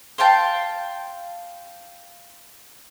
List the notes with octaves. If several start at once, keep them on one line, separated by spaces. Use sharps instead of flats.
C5 F5 G5 A5